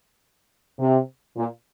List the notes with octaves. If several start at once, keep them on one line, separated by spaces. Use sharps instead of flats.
C3
A#2